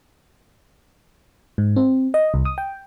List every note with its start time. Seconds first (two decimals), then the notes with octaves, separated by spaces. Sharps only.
1.58 G#2
1.76 C4
2.14 D#5
2.34 C2
2.45 D#6
2.58 G5